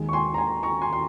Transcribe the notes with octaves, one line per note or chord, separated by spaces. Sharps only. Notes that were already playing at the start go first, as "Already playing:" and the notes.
Already playing: D#2 D#3 G#3
C#6
G#5 C6
A#5
G#5 C6
A#5 C#6
G#5 C6
C6